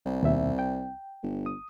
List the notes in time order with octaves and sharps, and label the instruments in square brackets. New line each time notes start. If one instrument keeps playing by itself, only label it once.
[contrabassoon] C2
[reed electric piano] D#2 B2 E5
G5
[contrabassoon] G1
[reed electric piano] D#6